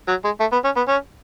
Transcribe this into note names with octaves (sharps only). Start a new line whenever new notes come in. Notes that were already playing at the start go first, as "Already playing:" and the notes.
F#3
G#3
A3
B3
C#4
B3
C#4